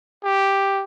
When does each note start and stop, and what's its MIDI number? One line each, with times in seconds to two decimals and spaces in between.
0.24 0.84 67